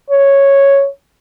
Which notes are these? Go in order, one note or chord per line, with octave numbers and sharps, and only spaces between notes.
C#5